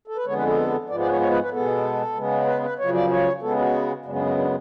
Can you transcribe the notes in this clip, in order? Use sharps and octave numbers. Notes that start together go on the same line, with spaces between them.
A4
B4
F2 D3 G#3 B3 C#5
B4
A4
G#2 F3 G#3 B3 D5
D5
B4
C#5
C#5
B4
B4
B2 G#3 B3 A4
C#3 G#3 B3
B4
B4
F#2 C#3 F3 C#5
D5
C#5
C#3 G#3 B3 A4
F#4
F#2 C#3 G#3 B3 D4
D4
F#4
D4